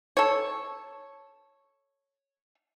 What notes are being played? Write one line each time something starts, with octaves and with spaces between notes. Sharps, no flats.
A4 C#5